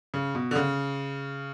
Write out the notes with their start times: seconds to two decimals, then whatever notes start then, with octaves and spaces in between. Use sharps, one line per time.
0.14 C#3
0.35 B2
0.51 D3
0.55 C#3